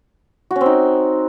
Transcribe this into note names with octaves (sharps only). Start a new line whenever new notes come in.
F#4
C#4
C4
D#4